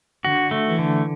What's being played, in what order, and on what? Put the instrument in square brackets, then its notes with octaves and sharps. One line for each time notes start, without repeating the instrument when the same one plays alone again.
[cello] D3 [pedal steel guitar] F#4
[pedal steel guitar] A3
[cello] E3
[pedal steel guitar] D3